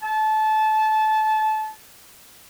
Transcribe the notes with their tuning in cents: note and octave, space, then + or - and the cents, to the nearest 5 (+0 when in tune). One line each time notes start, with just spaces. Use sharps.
A5 -20